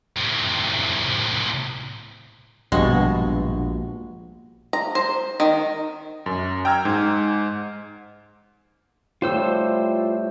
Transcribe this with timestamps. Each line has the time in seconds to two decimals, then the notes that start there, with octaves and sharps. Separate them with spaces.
0.16 A2 C3
2.72 A#1 G2 B2 G#3 F#4 C#6
4.73 A#5
4.95 C5
5.40 D#3
6.26 F#2
6.65 G5 A#5 E6 F6 G#6
6.85 G#2
9.22 A2 G3 F4 G4 C5 E6